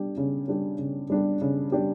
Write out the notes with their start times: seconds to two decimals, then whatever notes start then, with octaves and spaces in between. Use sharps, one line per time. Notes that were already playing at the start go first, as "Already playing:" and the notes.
Already playing: G3 D4 G4
0.17 C#3
0.48 G3 D4 G4
0.79 C#3
1.10 G3 D4 G4
1.41 C#3
1.72 G3 D4 G4